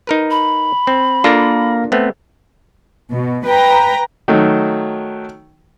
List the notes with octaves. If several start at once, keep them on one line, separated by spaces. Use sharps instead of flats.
D#4 A#4 B4
B5
C4
A#3 D4 F4 A4 A#4 A#6
A3 B3 C4
B2
B4 G5 A#5
D#3 F#3 A3